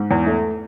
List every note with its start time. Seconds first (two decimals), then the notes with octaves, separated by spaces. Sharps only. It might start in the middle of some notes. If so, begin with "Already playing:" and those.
Already playing: G#2
0.11 E2
0.26 A3